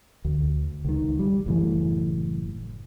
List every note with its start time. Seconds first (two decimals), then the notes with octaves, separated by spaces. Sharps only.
0.25 D2
0.85 C#2 D#3
1.19 G3
1.46 F#1 A2 E3